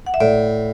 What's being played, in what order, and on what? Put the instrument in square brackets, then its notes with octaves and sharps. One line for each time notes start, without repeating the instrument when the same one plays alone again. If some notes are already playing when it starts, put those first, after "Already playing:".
[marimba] F#5
E5
[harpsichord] A2 [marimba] D5